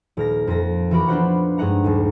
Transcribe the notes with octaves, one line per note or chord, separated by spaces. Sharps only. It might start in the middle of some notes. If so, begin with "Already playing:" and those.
D#1 A#4 A#6
F2 C4 A#6
E3 F3 F#4 A#4 B5 D6
B3 D4 F4 B4 C5 F#5
G2 G#3 D#4 F#5 A#5
D#1 D#2